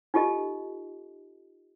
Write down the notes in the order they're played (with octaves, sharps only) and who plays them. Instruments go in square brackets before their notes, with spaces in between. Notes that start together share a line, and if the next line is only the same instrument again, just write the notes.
[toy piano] D#4 F4 G4 A4 D#5